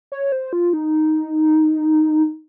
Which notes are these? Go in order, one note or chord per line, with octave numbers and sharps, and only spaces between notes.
C#5
C5
F4
D#4